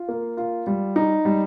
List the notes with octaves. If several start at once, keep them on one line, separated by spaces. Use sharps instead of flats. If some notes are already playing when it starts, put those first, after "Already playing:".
Already playing: F4
A#3
F4
G3
D#4
G3